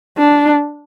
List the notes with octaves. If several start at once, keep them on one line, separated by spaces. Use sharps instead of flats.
D4